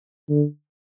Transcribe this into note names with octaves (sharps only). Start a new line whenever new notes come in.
D3